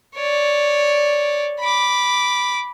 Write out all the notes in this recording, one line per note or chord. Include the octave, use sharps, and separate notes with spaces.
C#5 D5
B5 D6